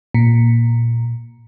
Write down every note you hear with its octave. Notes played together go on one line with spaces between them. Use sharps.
A#2